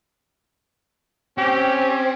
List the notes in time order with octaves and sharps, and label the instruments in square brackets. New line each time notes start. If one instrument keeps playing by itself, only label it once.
[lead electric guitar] C4 [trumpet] C#4 [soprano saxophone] G4